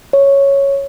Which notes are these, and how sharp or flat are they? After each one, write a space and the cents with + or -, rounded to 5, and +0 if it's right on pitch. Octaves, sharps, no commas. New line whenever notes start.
C#5 +0